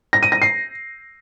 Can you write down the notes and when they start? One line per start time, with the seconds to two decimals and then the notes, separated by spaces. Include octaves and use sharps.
0.13 A#6
0.23 D#7
0.32 A#6
0.42 C7